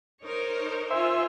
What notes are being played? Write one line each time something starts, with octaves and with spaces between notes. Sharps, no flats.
D#4 A#4 C5 C#5
F4 C5 E5 G#5